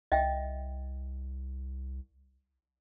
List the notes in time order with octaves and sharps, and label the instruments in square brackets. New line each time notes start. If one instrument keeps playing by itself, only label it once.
[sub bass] C2 [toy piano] D#5 E5 G5